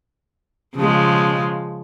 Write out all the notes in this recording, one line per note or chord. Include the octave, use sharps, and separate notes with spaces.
C#3 F3 G#3